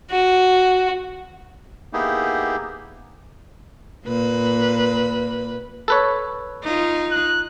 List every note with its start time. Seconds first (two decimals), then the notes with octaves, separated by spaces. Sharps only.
0.10 F#4
1.93 A#3 B3 D#4 E4 G4 G#4
4.06 A#2 B4
5.88 A4 B4 C#5
6.64 D#4 F4
7.11 F#6